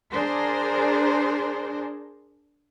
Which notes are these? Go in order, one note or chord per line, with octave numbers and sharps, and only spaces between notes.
D4 G#4 A#4 C5